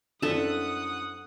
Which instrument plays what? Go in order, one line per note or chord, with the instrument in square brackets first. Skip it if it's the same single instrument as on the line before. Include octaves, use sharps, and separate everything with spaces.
[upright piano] F#2 C4 E4 [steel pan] D4 [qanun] A4 E5 [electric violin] F#5 D#6